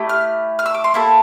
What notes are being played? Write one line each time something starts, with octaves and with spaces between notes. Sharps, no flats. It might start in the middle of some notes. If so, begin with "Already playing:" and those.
Already playing: A3 E4 G4
F6
F6
E6
D6
C6
A#3 E4 A4